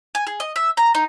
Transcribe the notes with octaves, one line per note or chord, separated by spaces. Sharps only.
G#5
G#4
D#5
E5
A#5
D#4